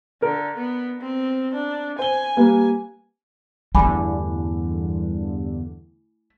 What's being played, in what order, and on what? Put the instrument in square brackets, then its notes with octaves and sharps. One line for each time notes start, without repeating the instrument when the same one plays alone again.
[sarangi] D3 [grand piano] A#4
[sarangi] B3
C4
D4
[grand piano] C5 G7 [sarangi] G#5
[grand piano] G3 A#3 B4
[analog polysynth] E2 G2 D3 [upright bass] A3 E4 [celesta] G#5 B5 D6